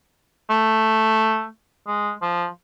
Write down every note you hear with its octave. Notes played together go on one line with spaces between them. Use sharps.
A3
G#3
F3